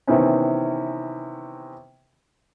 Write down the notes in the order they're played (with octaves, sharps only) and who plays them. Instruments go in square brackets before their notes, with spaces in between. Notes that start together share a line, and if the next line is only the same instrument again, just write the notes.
[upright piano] C3 D#3 E3 B3 C#4